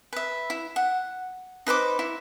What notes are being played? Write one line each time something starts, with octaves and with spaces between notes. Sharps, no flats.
B4 E5
E4
F#5
D#4 B4 C5 D6
E4